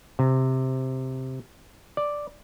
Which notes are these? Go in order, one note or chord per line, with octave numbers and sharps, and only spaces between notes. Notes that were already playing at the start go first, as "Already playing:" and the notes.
C3
D5